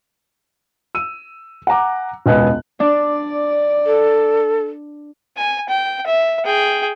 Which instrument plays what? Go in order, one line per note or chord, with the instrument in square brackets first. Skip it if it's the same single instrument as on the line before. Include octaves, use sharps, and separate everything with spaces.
[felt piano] E6 D#7
F#5 G#5 A#5 D6
E1 C#2 B3 D#5 G#5 F#6
[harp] D4 [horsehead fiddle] D5
[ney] A4
[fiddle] G#5
G5
E5
G#4 G5